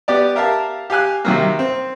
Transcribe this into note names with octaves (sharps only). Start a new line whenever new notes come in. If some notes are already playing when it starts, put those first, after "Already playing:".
B3 G4 D5
G4 A#4 E5 F5 A5
G4 F5 G#5 F#6
C3 D#3 F#3 A#3
C4